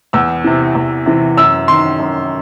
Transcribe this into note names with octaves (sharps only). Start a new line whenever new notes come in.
E2 E6
C3 E3
E2
C3 E3
F#2 E6
D#3 C6
F#2